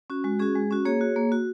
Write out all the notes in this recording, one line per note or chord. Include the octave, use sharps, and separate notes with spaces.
C#4 F#4
G#3 F#4
C#4 F#4 G#4
G#3
C#4 F#4
A#3 G#4 C#5
F#4
A#3
F#4